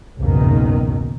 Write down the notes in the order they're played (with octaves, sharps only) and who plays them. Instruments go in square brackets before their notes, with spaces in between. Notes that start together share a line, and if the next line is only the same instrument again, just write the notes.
[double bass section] F#1 B2 D#3 [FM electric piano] C2 F2 G#2